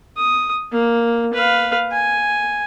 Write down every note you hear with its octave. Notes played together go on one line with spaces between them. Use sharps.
D#6
A#3
B4 F5
G#5